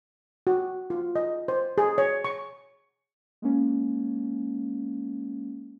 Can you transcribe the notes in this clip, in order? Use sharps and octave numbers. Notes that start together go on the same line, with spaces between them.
F#4
F4
D#5
C5
G#4
C#5
C#6
G#3 A#3 C#4